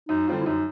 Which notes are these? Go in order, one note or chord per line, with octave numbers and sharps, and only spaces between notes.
F#2 D#4
D3 G3 C4 F4
E4
F#2 D#4